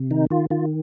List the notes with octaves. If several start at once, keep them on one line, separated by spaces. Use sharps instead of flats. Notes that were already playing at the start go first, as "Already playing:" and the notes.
Already playing: C3
D#3 D#4
D#3 F4
D#3 F4